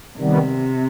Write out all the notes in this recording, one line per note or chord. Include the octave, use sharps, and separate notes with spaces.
C3 D#3 G3 B3